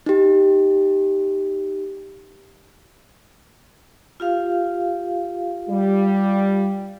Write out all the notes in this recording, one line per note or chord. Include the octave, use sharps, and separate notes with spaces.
D#4 G4
F4 G4 F5
G3